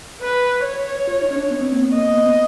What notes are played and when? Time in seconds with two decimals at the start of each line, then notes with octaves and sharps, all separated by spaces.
0.22 B4
0.64 C#5
1.07 F4
1.21 D#4
1.31 C#4
1.36 D4
1.51 B3
1.61 C4
1.72 A#3
1.82 B3
1.93 A#3 D#5
2.14 B3
2.26 B3